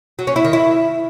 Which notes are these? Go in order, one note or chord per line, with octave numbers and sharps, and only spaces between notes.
F#3
C#4
E4
D#3
E4